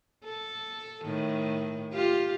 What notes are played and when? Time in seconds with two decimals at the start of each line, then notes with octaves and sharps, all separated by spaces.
0.25 A4
1.05 A2 D#3
1.93 F4 G4